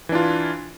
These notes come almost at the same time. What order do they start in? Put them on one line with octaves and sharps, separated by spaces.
E3 D4 F4